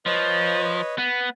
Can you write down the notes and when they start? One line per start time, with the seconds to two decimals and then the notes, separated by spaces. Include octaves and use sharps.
0.06 F3 B4 C#5 D#5
0.98 B3